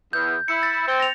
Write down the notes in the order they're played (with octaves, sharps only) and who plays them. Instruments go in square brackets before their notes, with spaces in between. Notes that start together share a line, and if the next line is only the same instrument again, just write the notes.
[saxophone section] E2 [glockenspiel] G6
[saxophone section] E4 [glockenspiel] C#7
[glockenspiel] A6
[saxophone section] C4
[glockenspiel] A#6 F7